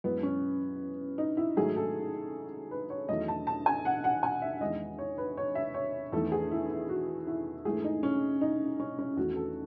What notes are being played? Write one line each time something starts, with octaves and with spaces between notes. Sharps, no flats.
F#2 E3 G#3 B3
C#4
D#4
E4
G#2 D#3 F#3 A3 G#4
A4
B4
C#5
E2 D#3 F#3 A3 D#5
A5
A5
G#5
F#5
F#5
G#5
E5
E2 D#3 G#3 D#5
C#5
B4
C#5
E5
C#5
E2 D#3 A3 A4
G#4
E4
E4
F#4
E4
G#2 E3 A3 G#4
D#4
C#4
D#4
C#4
C#4
E2 D#3 A3 F#4
A4